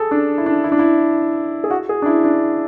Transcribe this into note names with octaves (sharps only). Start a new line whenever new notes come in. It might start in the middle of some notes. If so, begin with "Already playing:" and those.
Already playing: G#4 A4
D4
E4
D4
E4
D4
E4
G#4
F#4
G#4
D4
E4
D4